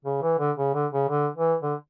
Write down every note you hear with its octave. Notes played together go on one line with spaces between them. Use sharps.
C#3
E3
D3
C#3
D3
C#3
D3
E3
D3